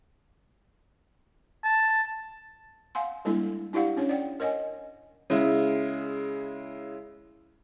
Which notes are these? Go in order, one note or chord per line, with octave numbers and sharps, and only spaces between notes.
A5
F5 F#5 G#5 C6
G3 G#3 A#3 D4 E4 A4
D4 E4 G4 D5 F5 F#5
C#4 D4 C#5
D5 F#5 G5
A#4 C#5 D#5 F#5 G#5
C#3 G#3 E4